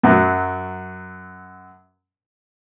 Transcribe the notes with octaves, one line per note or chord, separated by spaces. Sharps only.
F#2 F#3